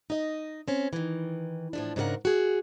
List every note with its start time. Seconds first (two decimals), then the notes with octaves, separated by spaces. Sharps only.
0.10 D#4 D#5
0.68 C4 C#4
0.93 D#3 E3
1.73 A2 F3 D4
1.96 G#2 C#3 D4 G4 A#4 F#5
2.25 F#4 G#4